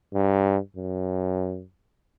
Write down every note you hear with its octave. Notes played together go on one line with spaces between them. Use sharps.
G2
F#2